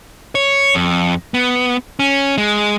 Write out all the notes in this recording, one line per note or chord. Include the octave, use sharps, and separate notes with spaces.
C#5
F2
B3
C#4
G#3